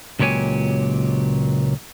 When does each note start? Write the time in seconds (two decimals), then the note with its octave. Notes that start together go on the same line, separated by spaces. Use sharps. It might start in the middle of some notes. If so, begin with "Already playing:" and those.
0.19 C#2 A#2 F#3 G4 C#5 G#5